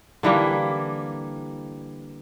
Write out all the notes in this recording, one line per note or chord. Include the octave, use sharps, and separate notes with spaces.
D3 E3 G3 A#3